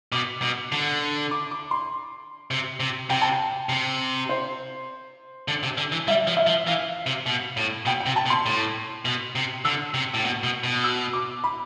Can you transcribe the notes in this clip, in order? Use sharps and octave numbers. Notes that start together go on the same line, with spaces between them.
B2 D6
B2
D3
D6
D6
C6
C3
C3
C3 G5
A5
G5
C3
C5
D3
C3
D3
E3
G3 E5
F3
E5
F3
E3 F5
C3
B2
A2
B2 G5
G5
C3
A5
B2
C6
A2
B2
C3
D3 E6
C3
A2
B2
B2
B2
E6
D6
B5